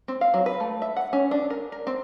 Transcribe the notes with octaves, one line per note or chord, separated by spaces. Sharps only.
C4
F5
F#3
B4
A3
E5
F#5
C#4
D4
A#4
A#4
C4